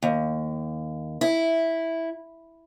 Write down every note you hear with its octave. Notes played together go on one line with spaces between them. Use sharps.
D#2
E4